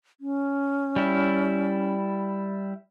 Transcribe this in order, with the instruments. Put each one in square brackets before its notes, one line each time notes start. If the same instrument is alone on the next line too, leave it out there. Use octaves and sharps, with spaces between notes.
[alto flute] C#4
[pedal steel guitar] G3 E4